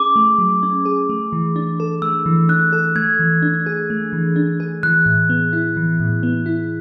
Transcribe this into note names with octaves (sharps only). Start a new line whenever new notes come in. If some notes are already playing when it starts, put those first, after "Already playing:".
Already playing: C#4 G#4 D6
A3
F#3
C#4
G#4
A3
E3
D4
A4
A3 E6
E3
D4 F#6
A4
A3 G#6
E3
D4
G#4
A3
E3
D4
G#4
E3 F#6
A2
B3
E4
E3
A2
B3
E4